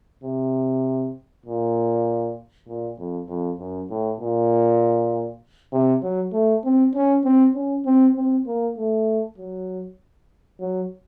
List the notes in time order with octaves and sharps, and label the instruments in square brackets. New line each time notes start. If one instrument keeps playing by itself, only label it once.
[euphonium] C3
A#2
A#2
F2
F2
F#2
A2
A#2
C3
F#3
A3
C4
C#4
C4
C#4
C4
C4
A#3
A3
F#3
F#3